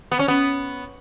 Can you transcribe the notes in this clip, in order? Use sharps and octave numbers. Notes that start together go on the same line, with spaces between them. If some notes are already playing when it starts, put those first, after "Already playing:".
B3
C#4
B3